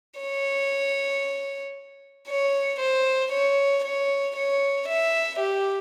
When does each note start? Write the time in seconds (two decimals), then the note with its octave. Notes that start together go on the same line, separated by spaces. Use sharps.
0.20 C#5
2.28 C#5
2.80 C5
3.32 C#5
3.84 C#5
4.36 C#5
4.88 E5
5.40 G4